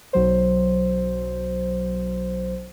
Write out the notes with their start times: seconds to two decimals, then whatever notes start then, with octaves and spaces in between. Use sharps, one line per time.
0.13 B1 F#3 C5